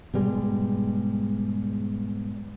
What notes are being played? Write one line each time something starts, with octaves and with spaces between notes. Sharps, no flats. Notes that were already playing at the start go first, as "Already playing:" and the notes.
G#2 B2 G3 G#3